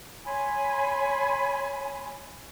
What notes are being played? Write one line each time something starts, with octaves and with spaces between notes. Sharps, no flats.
C#5 G#5 B5 C6